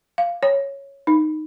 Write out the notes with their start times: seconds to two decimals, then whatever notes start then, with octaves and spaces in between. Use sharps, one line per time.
0.18 F5
0.43 C#5
1.07 D#4